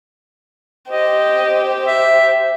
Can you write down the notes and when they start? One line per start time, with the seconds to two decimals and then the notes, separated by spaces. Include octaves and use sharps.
0.90 G4 C5 D#5
1.87 E5